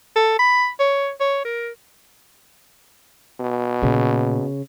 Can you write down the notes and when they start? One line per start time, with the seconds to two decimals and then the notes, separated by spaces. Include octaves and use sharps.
0.16 A4
0.39 B5
0.80 C#5
1.20 C#5
1.45 A#4
3.40 B2
3.82 A#2 C#3